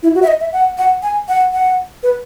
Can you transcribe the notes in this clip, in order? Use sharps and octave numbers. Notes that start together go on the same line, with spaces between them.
E4
F#4
E5
D#5
E5
F#5
F#5
G#5
F#5
F#5
B4